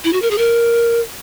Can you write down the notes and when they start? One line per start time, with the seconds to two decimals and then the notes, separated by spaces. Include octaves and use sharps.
0.04 E4
0.13 F#4
0.22 A#4
0.31 G#4
0.38 A#4